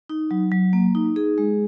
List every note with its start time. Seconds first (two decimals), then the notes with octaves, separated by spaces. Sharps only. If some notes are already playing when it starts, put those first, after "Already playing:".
0.09 D#4
0.31 F#3
0.52 F#3
0.73 A#3
0.95 D#4
1.16 G#4
1.38 G#3